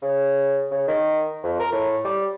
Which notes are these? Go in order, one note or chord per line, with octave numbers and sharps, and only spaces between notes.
C#3
C#3
D#3
F2
A#4
A2
G3